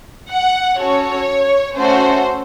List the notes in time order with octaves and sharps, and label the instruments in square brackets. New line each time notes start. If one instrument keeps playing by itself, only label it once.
[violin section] F#5
C#4 F#4 A4 C#5
A3 C#4 F#4 A4 C5